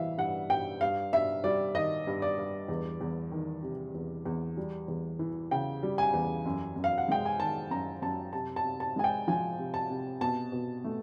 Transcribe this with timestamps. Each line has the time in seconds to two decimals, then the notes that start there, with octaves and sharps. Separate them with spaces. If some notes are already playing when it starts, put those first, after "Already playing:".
Already playing: E3 G3 E5 F5
0.18 G2 F#5
0.50 G2 G5
0.81 G2 F5
1.13 G2 E5
1.44 G3 D5
1.75 D#3 D#5
2.07 G2
2.22 D5
2.38 G2
2.69 E2
3.01 E2
3.32 D#3
3.63 C3
3.95 E2
4.25 E2
4.57 G3
4.88 E2
5.19 E3
5.51 C#3 G5
5.83 G3
5.98 G#5
6.13 E2
6.46 F#2
6.76 F#2
6.84 F5
6.98 F#5
7.08 G#3 G5
7.25 G#5
7.39 D#3 A5
7.71 F#2 A#5
8.02 F#2 A5
8.33 C3 A5
8.56 A5
8.64 C3
8.80 A5
8.96 G#3 G#5
9.04 G5
9.28 F3 G#5
9.58 C3
9.74 A5
9.90 C3
10.21 B2 A5
10.52 B2
10.84 A3